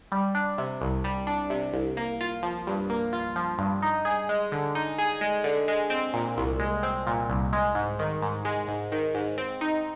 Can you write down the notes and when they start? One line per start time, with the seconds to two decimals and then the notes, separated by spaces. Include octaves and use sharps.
0.12 G3
0.35 D4
0.58 C3
0.81 C2
1.04 G3
1.27 D4
1.50 C3
1.73 C2
1.97 A#3
2.21 F4
2.43 F3
2.67 G2
2.90 A#3
3.13 F4
3.36 F3
3.59 G2
3.82 D#4
4.05 G#4
4.29 G#3
4.52 D3
4.75 D#4
4.98 G#4
5.21 G#3
5.44 D3
5.68 G#3
5.90 C4
6.14 A#2
6.37 C2
6.60 G#3
6.83 C4
7.07 A#2
7.29 C2
7.53 G#3
7.75 G#2
7.99 D#3
8.22 G#2
8.45 G#3
8.68 G#2
8.92 D#3
9.14 G#2
9.38 C4
9.61 D#4